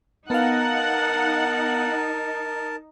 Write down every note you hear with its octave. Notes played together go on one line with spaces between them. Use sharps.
B3 D#4 A#4 F5 F#5 A5